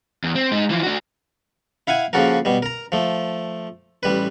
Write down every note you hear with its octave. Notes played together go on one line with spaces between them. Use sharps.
E2
C4
G#3 D#4
E3 F3
D4 F#4
E4 F5 F#5 G#5
C#3 F3 A#3 F#4 A4 A#4
B2 G3
A#4 A#5
F3 A3
A1 G3 B4